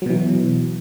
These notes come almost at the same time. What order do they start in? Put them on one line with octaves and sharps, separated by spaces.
F#3 B2 E3